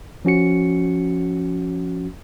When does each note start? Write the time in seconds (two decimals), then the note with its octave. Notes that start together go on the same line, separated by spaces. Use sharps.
0.25 F3 C#4 F#4 C#7